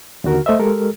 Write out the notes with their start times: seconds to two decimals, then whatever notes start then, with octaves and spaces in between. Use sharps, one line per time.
0.24 D#2 D3 F#4 A#4
0.46 A3 C5 D#5 E5
0.59 G#3 G4 A4 A#4